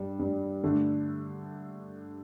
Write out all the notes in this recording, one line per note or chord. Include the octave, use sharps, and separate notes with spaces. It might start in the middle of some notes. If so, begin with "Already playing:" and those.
Already playing: G2 G3 D4
G2 G3 D4
G2 D3 A3 D4